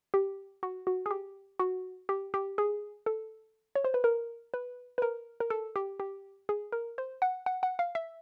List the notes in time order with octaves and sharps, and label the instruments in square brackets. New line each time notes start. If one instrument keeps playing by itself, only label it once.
[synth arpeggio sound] G4
F#4
F#4
G#4
G4
F#4
G4
G4
G#4
A4
C#5
C5
B4
A#4
B4
B4
A#4
A#4
A4
G4
G4
G#4
A#4
C5
F#5
F#5
F#5
F5
E5